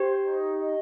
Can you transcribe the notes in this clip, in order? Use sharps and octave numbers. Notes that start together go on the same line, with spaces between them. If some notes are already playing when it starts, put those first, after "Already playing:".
Already playing: G4 C5
D#4
D#5